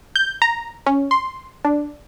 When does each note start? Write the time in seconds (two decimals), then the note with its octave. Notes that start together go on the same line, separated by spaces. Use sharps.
0.16 G6
0.42 A#5
0.86 C#4
1.11 C6
1.65 D4